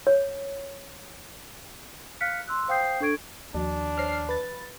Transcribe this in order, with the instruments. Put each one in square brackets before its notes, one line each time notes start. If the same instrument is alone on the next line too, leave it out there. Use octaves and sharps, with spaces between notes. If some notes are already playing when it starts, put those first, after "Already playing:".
[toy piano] C#5
[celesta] F5 F6 F#6 B6 C#7
C6 E6 F#6
C5 F5 G5 D#6 G6 C7
D4 A4 C#6 G#6 D7
[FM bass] D#2 [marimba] F3 F#4 [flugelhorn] D4
[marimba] C5 C#5 A#6 [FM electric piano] F6 C7
[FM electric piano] B4 A6